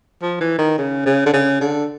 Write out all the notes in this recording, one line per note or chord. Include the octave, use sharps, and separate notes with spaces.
F3
E3
D#3
C#3
C#3
D3
C#3
D3